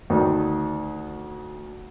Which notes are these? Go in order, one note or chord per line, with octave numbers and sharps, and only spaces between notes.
D2 D#3